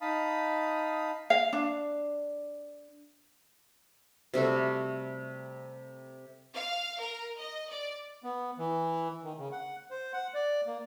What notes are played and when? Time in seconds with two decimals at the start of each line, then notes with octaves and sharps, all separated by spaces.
0.01 D#4 F5 A5 B5 D#6
1.30 F5
1.53 D4
4.34 C3 G3 A3 F#4
6.55 F5
7.00 A#4
7.37 D#5
7.70 D5
8.24 B3
8.59 E3
9.24 D#3
9.38 C#3
9.52 F#5
9.91 C5
10.13 F#5
10.34 D5
10.67 A#3